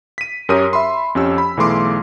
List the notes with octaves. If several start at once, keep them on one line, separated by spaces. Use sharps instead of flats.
B6 D#7
F#2 G4 A#4 C#5 D#6 D#7
E5 B5 C6
F2 C#4 G4 E6
B5
B1 E3 A3 G#4 C6 D6